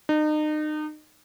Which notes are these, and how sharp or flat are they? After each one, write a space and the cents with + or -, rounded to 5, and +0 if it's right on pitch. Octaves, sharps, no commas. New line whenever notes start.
D#4 -35